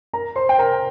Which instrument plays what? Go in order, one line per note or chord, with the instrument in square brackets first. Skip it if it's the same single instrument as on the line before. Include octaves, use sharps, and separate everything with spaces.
[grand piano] A#4 A#5
C5 C6
G5
A#4 A#5